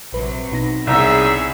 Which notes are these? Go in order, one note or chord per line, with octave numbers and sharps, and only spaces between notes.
A#1 C3 F#3 B4
B2 D#4 A#6
C2 B3 C#4 G#4 E5 A#5 E6